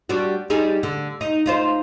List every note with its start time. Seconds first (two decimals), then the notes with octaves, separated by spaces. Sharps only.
0.09 G3 D4 F#4
0.50 G3 D#4 G#4
0.83 D3
1.21 D#4
1.46 D#4 F4 C5